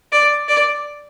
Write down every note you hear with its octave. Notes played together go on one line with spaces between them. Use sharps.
D5
D5